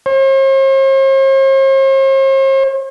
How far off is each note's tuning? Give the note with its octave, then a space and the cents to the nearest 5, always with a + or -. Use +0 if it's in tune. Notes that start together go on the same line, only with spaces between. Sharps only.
C5 +45